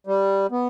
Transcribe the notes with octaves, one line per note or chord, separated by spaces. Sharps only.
G3
B3